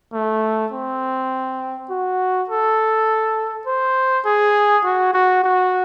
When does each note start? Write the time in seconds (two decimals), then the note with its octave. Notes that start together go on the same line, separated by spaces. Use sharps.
0.13 A3
0.72 C4
1.90 F#4
2.50 A4
3.67 C5
4.25 G#4
4.84 F#4
5.14 F#4
5.44 F#4